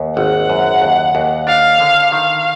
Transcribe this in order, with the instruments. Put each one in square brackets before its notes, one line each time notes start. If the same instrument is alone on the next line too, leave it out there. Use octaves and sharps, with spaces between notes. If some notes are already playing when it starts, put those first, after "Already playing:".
Already playing: [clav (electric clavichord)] D#2
[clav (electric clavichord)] G#1 [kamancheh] F#5
[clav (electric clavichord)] F#2
D#2
D#2
[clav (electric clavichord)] D4 [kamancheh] F5
[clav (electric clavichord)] D3
[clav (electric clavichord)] D#3 [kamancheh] F5